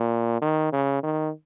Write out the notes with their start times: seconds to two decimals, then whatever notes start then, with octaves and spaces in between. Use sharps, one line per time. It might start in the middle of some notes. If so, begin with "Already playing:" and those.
Already playing: A#2
0.41 D#3
0.72 C#3
1.03 D#3